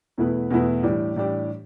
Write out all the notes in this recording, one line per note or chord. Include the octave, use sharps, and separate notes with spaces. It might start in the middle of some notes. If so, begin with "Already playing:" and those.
E2 B2 A3 E4 B4
E2 B2 A3 E4 B4
A2 E3 G3 D4 G4
A2 E3 G3 D4 G4